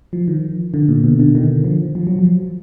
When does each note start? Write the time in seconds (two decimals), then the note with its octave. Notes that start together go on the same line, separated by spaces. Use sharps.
0.13 F3
0.28 D#3
0.74 D3
0.88 A#2
1.04 B2
1.20 D3
1.35 D#3
1.64 F3
1.95 F3
2.07 F#3
2.19 F3